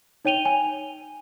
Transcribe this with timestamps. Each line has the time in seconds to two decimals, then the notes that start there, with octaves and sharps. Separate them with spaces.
0.25 D#4 C#5 G5 D#7 F7 G7
0.45 G#5